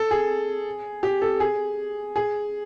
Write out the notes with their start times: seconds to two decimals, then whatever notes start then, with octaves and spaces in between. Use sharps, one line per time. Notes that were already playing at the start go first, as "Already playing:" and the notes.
Already playing: A4
0.11 G#4
1.03 G4
1.22 A4
1.40 G#4
2.16 G#4